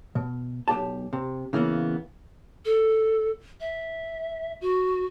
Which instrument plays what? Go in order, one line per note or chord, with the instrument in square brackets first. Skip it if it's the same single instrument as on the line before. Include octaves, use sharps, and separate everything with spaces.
[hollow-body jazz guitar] B2
B1 G4 A5
C3
C#3 E3 A#3 B3
[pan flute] A4
E5
F#4